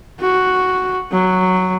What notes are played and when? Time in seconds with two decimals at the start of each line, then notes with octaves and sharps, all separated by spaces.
0.20 F#4
1.12 F#3